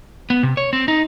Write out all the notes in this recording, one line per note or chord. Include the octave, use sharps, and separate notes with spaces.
B3
C3
C#5
C4
D#4